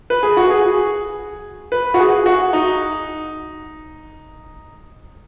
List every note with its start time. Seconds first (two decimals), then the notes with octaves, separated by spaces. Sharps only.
0.10 B4
0.23 G#4
0.37 F#4
0.50 G#4
1.72 B4
1.94 F#4
1.99 G#4
2.26 F#4
2.53 D#4